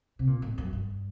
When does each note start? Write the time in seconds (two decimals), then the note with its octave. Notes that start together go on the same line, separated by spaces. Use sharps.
0.19 C3
0.27 A#2
0.42 A2
0.58 F#2
0.73 G2